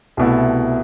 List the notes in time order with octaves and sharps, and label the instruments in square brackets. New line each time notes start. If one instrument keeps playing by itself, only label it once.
[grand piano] C2 B2 A3 E4